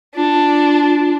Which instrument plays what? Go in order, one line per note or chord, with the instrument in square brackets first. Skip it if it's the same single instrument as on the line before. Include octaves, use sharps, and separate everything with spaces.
[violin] D4 [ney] F4